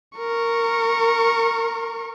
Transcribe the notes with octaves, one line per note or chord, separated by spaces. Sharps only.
A#4 C#6